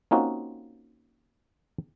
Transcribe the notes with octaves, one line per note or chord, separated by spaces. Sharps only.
A#3 C4 C#4 D#4 F4 F#4